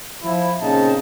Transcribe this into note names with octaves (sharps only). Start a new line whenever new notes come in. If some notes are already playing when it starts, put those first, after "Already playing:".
F3 E4
A#2 C#3 C4 D#4 G5 A5